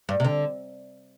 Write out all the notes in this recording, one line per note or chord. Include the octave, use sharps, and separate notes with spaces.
G2
C3
D3